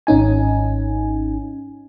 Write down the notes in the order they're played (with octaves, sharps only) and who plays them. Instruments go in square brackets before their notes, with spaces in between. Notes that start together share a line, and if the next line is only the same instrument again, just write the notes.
[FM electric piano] G#1 C#4 D#4 G#5